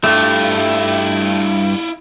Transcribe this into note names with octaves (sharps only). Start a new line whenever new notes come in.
G2 A3 E4 F4 G4